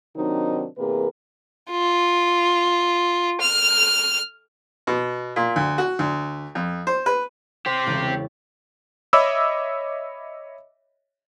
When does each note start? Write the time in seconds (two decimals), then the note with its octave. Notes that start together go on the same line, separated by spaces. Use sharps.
0.17 C3 D#3 F#3 C4 D4 D#4
0.78 E2 C3 A#3 G#4 A#4 B4
1.71 F4
3.40 F6
4.87 B2
5.36 A#2
5.56 D2
5.78 F#4
5.99 D2
6.55 F2
6.87 C5
7.06 B4
7.66 C4 G4 C5
7.87 E1 C#3 A6
9.13 C#5 D#5 E5 B5 D6 E6